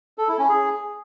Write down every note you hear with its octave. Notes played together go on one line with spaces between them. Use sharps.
A4
E4
C#4
G#4